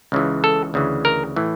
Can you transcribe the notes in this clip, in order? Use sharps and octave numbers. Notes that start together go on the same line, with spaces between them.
C#2 C#3 E3
A4
D2 C#3 E3
A#4
A2 E3